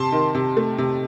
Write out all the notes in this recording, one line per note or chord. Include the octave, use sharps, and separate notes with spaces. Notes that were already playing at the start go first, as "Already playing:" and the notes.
Already playing: C3 A5 C6
D#3
C3
A3
C3